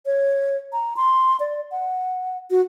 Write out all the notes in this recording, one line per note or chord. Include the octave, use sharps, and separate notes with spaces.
C#5
A#5
C6
D5
F#5
F#4